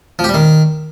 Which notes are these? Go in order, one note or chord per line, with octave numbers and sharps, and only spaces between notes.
F3
G4
G3
D#3